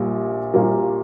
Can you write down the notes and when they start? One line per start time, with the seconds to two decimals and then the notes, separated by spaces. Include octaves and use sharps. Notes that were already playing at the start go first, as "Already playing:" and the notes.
Already playing: A#1 A#2 G3 A#3
0.54 A#1 A#2 G3 A#3